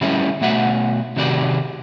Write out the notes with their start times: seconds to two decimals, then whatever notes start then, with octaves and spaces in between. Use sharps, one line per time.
0.01 D3 G3 A3 C#4 E4
0.41 B2 A3 F#4 E5 F#5
1.16 C3 D#3 F#4 G4 D5